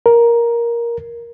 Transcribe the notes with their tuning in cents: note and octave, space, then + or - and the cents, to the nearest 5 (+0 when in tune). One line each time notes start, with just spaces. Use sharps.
A#4 +10